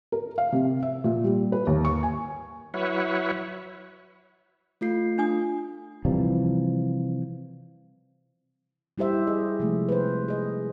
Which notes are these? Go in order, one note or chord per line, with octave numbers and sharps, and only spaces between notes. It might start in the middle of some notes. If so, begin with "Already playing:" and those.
A#4
F5
C3
E5
A#2
G3
B4
D#2
C#6
G#5
F#3 E4 B4 C#5 E5 F#5
A3 F4 C7
D4 G#5 D#6
C3 E3 F3 G3
G3 E4 G4 C5 E5
G#4 D#5
C3 F3 G#3 A3
B4 C5
G#4 D#5